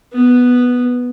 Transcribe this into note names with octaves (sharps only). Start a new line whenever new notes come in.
B3